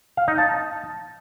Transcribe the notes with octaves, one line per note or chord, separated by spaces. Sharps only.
F5
D#4
A5